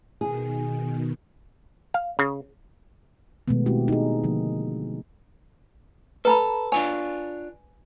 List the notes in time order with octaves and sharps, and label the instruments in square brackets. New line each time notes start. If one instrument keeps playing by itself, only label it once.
[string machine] B2 D#3 [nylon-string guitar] G#4
[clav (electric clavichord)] F5
C#3
[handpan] B2 D#3 G#3 A3 B3
G#3 A3 C4 E4 F#4 G4
D#4 G#4
D3 F3 A#3
[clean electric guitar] A4 [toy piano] B4 A#5 B5
[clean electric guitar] D4 F4 C#5 [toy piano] G#5